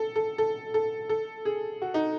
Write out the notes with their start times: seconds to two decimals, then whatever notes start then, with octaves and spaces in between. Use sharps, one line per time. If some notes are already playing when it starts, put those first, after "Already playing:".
Already playing: A4
0.16 A4
0.38 A4
0.74 A4
1.09 A4
1.45 G#4
1.82 F#4
1.94 D#4